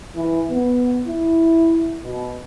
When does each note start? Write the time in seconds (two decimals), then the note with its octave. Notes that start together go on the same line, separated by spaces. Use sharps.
0.16 E3
0.50 B3
1.08 E4
2.03 B2